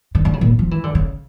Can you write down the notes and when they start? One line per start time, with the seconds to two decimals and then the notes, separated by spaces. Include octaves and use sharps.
0.15 D3
0.25 D3
0.33 C#3
0.41 A#2
0.59 F3
0.71 E3
0.84 D3
0.95 C#3